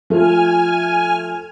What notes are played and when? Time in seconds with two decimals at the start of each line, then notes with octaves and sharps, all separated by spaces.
0.10 F3 A3 G#5 F6